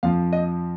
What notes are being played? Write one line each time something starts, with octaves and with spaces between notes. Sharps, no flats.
F2 F3 F5
D#5